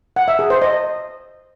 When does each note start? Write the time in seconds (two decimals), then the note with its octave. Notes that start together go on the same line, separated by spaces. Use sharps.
0.16 F#5
0.28 E5
0.39 G#4
0.50 C5
0.62 D#5